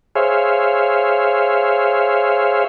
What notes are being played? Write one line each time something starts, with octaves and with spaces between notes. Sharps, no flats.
G#4 C5 C#5 E5 F5